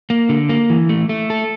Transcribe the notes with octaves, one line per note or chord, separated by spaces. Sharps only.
A#3
D3
A#3
E3
A3
A3
A4